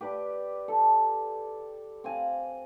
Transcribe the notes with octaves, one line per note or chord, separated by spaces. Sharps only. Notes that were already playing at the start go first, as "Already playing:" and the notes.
G4 B4 D5
A4
C4 F5 G#5